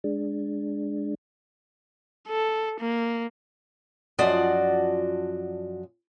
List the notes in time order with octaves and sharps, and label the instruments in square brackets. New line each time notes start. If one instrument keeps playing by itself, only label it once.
[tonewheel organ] G#3 D4
[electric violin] A4
A#3
[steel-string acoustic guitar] F#2 F3 F4 F#4 D5 D#5